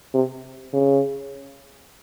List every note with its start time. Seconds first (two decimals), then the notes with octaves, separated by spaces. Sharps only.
0.14 C3
0.73 C#3